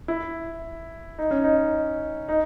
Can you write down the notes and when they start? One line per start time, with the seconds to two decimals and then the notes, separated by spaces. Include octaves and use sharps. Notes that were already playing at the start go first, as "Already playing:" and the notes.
0.08 E4
1.19 D#4
1.31 C#4
1.44 D#4
2.29 D#4